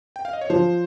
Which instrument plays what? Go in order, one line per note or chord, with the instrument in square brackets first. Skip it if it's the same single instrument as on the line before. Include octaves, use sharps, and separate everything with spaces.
[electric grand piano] G5
F5
D#5
C#5
[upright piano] F3 [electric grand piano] C5